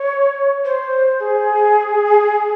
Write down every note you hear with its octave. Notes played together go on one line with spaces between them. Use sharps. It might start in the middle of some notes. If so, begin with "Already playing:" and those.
Already playing: C#5
C5
G#4